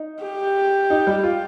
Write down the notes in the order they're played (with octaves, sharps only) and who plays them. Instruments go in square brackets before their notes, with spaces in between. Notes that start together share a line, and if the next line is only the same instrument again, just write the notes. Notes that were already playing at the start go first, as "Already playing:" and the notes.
Already playing: [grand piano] D#4
[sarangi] G4
[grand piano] D#4
G3
F4